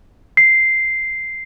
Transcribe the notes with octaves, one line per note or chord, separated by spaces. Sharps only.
C7